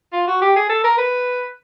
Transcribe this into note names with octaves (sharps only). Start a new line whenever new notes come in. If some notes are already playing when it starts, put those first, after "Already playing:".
F4
F#4
G4
G#4
A4
A#4
B4